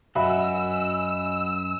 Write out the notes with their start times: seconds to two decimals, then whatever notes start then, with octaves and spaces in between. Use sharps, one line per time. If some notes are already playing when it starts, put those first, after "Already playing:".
0.15 C2 F#2 F#4 D#5 E5 G#5 B5 E6